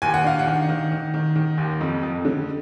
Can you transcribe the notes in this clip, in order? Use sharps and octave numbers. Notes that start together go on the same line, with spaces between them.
D#2 G#5
F#5
D4 F5
F#5
D#3
D#3
D#3
D#3
D#3
D#2
F2
F2
D3